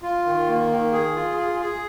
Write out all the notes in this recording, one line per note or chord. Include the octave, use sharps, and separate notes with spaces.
F4
D#3
A#3
D#3
G#4
F4
G#4
G#4